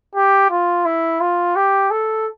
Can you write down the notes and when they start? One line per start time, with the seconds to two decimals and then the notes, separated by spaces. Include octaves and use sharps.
0.15 G4
0.50 F4
0.85 E4
1.20 F4
1.56 G4
1.91 A4